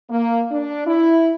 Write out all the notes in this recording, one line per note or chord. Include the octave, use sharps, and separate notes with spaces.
A#3
D4
E4